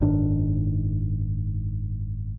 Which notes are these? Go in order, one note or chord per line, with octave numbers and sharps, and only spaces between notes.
F#1 G#2 D#3 D4